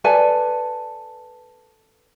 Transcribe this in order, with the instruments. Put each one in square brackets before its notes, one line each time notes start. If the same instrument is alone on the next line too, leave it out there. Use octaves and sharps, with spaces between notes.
[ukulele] A4 B4 D5 G#5